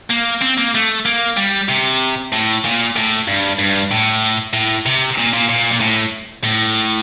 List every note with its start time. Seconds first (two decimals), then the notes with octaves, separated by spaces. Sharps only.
0.11 A#3
0.42 C4
0.58 A#3
0.75 A3
1.06 A#3
1.37 G3
1.69 C3
2.32 A2
2.65 A#2
2.96 A2
3.28 G2
3.59 G2
3.91 A2
4.54 A2
4.86 C3
5.18 A#2
5.33 A#2
5.49 A#2
5.72 A#2
5.80 A2
6.44 A2